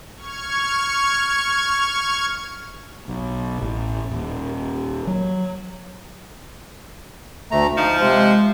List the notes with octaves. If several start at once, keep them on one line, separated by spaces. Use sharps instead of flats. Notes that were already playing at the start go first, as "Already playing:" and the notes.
C#6 F6 G#6
B1
A1
D#1
F#3
D2 A3 A#5
F3 D#4
C3 G#3 C5